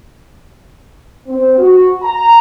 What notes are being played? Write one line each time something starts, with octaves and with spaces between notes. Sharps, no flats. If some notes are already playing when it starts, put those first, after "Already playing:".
C4
F#4
A#5